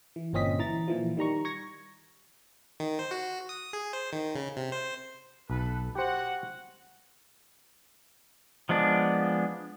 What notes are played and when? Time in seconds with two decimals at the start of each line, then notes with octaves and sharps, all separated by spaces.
0.16 E3
0.33 G1 A#2 C4 C#4 D#5 B6
0.59 E3 A#5 A6
0.88 A#2 E3 F3
1.17 D#3 G3 A#5 C#6
1.45 C#6 G#6 A#6
2.80 D#3
2.99 C5
3.11 F#4
3.49 D#6
3.73 G#4
3.93 C5
4.13 D#3
4.35 C#3
4.57 C3
4.72 C5
5.50 B1 A4 B4
5.95 F#4 G4 C5 F#5
8.69 F3 G#3 B3 D4